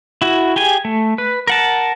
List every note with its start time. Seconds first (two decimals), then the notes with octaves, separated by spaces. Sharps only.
0.22 E4 F#4
0.56 G4 G#4 G#5
0.85 A3
1.18 B4
1.47 A#4 F#5 A5